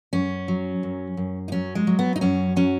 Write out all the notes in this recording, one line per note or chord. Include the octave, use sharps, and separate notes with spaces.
F#2 C#4
F#3
F#2
F#2
D#4
F#3 C#4
G#3
F#3
B3
D#4
F#2 C#4
F#3 C#4